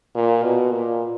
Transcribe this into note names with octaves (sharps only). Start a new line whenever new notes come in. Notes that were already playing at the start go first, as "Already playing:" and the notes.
A#2
B2
A#2